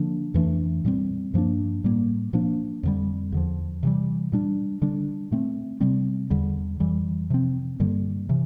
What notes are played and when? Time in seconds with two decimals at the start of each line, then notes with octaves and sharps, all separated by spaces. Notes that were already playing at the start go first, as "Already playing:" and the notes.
Already playing: D3 F3 A#3 D4
0.34 F2 E3 A3 D4
0.85 A#2 G3 C4
1.34 G2 F3 A#3 D4
1.84 A2 G3 A#3
2.33 A#2 F3 A#3 D4
2.83 F2 D3 G3
3.32 E2 D3 F3
3.83 C3 E3 G3
4.32 A#2 G3 D4
4.82 D3 G3 D4
5.31 A#2 A3 C4
5.80 C3 G3 C4
6.30 E2 D3 G3
6.80 F2 E3 G3
7.30 C3 F3 C4
7.80 G2 D3 G3 A#3
8.29 C3 E3